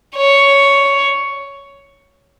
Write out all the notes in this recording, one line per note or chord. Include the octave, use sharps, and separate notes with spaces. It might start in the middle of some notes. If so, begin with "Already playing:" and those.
C#5